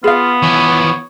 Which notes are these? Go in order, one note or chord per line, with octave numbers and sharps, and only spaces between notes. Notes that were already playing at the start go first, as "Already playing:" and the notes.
B3 F4 G#4 F5
E3 F3 C#5